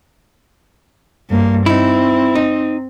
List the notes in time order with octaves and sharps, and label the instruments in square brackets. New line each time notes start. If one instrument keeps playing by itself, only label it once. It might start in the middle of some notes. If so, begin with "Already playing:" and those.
[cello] G2 A#3
[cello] C4 [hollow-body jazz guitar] D#4 E4
[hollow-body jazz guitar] D#4